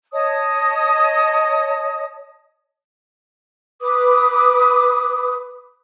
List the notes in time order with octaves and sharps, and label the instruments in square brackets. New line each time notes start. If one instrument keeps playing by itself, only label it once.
[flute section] C#5 D#5 A5 D#6
B4 D6 D#6